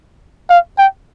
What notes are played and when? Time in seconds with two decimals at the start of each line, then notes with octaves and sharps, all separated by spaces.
0.50 F5
0.78 G5